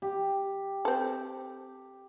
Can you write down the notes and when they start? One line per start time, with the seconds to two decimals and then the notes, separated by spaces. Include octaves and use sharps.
0.02 G4
0.85 C4 A4